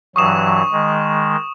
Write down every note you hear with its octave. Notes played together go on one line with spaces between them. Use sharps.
G2 E3 F#3 C#6 D#6 E7
D#3 G#3